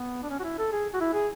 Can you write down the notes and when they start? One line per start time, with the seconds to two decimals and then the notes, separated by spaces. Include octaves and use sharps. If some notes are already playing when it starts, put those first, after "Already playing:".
Already playing: B3
0.23 D4
0.30 C#4
0.40 F#4
0.44 E4
0.58 A4
0.73 G#4
0.94 F#4
1.01 E4
1.14 G#4